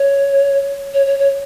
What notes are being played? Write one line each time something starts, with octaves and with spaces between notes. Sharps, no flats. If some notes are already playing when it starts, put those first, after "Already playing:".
Already playing: C#5
C#5
C#5
C#5